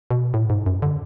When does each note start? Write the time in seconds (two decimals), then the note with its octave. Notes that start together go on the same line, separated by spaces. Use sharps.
0.11 B2
0.34 A2
0.50 G#2
0.66 F#2
0.82 D3